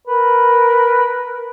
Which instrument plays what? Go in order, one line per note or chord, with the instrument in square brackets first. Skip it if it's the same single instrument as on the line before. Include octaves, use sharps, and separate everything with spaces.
[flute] A#4 [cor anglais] B4